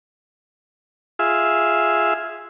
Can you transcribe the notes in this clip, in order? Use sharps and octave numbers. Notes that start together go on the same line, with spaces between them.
F4 G#4 E5